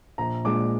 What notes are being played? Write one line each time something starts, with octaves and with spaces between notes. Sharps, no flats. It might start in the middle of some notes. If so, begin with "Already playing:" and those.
A#1 A#5
A#2 G#3 D4 D6